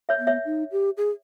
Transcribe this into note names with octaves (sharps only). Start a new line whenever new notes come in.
C#5 E5
B3
C#5 E5
D#4
G4
G#4